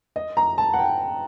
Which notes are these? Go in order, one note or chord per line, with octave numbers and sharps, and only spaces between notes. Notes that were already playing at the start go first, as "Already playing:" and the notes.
D#5
A#5
A5
F#5
G5